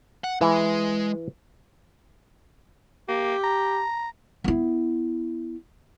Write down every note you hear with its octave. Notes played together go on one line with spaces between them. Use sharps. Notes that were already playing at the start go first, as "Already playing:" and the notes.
F#5
E3 G#3
A#3 G4
A#5
B3 E4